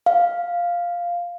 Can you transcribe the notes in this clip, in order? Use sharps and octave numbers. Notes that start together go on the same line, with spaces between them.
F5